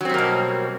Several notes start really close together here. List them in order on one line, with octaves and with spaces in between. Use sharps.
F#3 C4 G3 A#3 B2